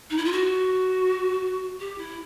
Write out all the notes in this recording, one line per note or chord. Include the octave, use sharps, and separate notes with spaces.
D#4
E4
F4
F#4
G4
E4